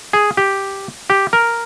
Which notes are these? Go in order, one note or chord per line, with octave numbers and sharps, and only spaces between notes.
G#4
G4
G4
A#4